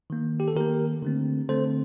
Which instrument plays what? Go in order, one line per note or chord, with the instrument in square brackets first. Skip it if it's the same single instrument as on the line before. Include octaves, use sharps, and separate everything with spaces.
[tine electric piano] D#3 A#3
G4
A4
D#3 A#3 G4 A#4
D3 A3 C4
D3 A3 C4 A4 C5